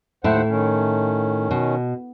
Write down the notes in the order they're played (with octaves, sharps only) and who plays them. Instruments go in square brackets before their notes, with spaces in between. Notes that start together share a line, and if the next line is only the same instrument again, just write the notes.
[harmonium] D#2 C5 F#5 [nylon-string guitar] A2 E4
[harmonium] D#3 C#4
[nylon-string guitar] B2